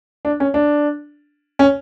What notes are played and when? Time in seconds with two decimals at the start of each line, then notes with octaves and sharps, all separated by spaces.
0.25 D4
0.40 C#4
0.54 D4
1.59 C#4